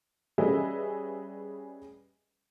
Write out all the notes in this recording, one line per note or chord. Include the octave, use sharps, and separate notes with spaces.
G3 C#4 G#4 B4 D#5 E5